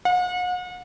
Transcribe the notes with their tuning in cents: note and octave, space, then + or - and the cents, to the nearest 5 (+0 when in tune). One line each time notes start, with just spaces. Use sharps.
F#5 -40